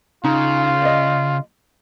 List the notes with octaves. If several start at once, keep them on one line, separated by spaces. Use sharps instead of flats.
C#3 D#4 F4
D5 D#5